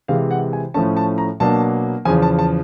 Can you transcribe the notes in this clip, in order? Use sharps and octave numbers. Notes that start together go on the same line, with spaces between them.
C3 E3 G#3 F5
F#5
G#5
A2 F3 A3 C#4 A5
A5
A#5
B2 F#3 A#3 D4 A5
E2 C#3 F3 G#5
A5
A5